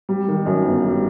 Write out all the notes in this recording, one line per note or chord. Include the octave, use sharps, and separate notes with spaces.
G3
D#3
F#2
G1
G3